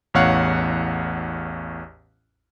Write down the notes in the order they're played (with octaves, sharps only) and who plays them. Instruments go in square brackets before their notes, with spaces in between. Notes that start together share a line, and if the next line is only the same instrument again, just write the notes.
[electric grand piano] A1 E2 C#5 F5 F#5